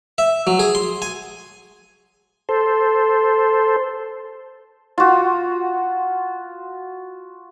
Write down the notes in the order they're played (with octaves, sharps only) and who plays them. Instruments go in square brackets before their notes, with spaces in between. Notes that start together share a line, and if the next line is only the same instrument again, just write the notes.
[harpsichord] E5
F#3
G#4
C6
G#5
[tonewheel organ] A4 C5
[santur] F4 F#4